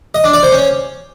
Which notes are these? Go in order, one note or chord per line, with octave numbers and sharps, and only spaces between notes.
D#5
D4
D5
C5
C#4